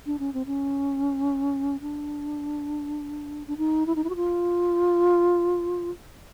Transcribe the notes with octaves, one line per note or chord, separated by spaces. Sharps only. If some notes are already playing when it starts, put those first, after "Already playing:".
D4
C#4
C4
C#4
D4
D4
D#4
E4
D#4
E4
F#4
F4